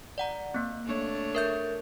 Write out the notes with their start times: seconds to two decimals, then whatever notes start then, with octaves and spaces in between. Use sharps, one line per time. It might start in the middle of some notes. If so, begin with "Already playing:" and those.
0.18 D5 F#5 A#5
0.54 A#3 C4
0.86 A3 D4 C#5
1.35 A#4 E5 G6